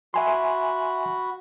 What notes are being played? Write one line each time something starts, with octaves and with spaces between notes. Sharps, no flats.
F#4 E5 G#5 B5 C6